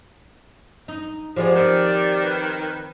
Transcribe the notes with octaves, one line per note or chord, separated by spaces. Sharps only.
D#4
F3 G#3 B3 G4 D5
D#3 C4
B4